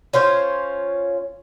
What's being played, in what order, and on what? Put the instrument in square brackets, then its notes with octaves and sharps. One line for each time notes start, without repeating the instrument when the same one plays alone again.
[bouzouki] C#4 F4 C5 C#5